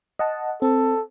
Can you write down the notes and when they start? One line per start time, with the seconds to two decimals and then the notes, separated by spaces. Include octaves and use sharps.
0.19 D#5 F#5 A5
0.62 C4 A4